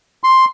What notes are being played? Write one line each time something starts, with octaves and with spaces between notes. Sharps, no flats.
C6